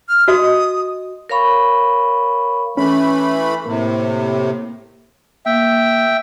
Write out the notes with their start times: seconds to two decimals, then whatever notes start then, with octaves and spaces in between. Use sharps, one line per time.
0.09 F6
0.28 F#4 D#5 C6 D#6
1.29 A#4 C#5 F5 B5 C#6
2.77 E3 A3 C#4 B5
3.66 A2 C3 A#3
5.46 A#3 E5 G5